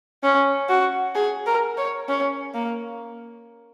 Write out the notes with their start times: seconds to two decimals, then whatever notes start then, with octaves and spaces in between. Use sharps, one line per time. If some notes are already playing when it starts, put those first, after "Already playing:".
0.23 C#4
0.69 F#4
1.15 G#4
1.47 A#4
1.78 C#5
2.08 C#4
2.54 A#3